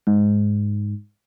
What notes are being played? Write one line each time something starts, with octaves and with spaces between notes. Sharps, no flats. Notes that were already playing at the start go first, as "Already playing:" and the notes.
G#2